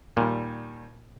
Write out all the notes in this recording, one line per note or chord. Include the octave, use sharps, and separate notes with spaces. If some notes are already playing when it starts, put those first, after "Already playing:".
D#2 A#2 D#3 G3